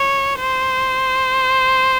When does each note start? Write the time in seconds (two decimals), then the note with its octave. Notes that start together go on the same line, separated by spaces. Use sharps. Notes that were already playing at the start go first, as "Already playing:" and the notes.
Already playing: C#5
0.40 C5